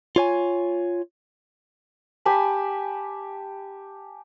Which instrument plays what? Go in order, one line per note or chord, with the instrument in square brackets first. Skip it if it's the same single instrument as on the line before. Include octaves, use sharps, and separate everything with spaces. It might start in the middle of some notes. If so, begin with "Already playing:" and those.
[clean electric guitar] F4 C#5 G#5
[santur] G4 G#5 A5 B5